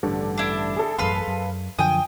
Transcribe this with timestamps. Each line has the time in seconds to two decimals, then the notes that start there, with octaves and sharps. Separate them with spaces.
0.03 A1 G2 D3 G3
0.38 D4 E4
0.76 G#4 A4
0.98 A1 F#2 B4 F5 C6
1.28 F#2
1.79 F#2 D3 F3 G5 G#5 D#6